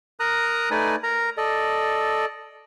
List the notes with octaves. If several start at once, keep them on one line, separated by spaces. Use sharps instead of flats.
A#4 A#5 D#6 F#6
A3 D#4 B4 D5 G#5
A#4 A#5
A4 D5 D#5